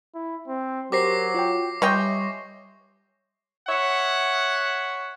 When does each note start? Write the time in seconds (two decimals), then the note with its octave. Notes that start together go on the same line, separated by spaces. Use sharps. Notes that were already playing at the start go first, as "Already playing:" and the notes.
0.15 E4
0.48 C4
0.92 F#3 G4 A#4 C5 D6 A#6 C7
1.34 F4 C#5 G5
1.82 G3 C#5 D#5 E5 G5 G#5 C6 C#6
3.68 C#5 E5 F#5